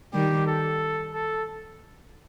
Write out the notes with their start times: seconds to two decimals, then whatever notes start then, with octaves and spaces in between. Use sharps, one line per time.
0.13 D#3 G3 G4
0.47 A4
1.14 A4